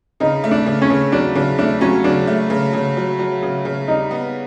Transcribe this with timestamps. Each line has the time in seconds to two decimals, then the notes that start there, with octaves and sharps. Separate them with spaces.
0.20 C#3 D#4
0.44 A3
0.51 D4
0.66 C#3
0.82 C#4
0.90 C#3
1.12 F#3 D4
1.35 C#3 D4
1.58 A3 D4
1.81 F#3 C#4
2.04 C#3 D4
2.27 A3
2.50 C#3
2.73 C#3
2.97 F#3
3.19 F#3
3.43 C#3
3.65 C#3
3.88 G3 D#4
4.11 B3